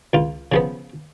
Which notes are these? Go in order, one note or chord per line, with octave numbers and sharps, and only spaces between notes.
C#2 F4
C#3 F3 B3